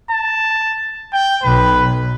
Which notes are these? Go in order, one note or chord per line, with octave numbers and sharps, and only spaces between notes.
A5
G5
B1 B2 B4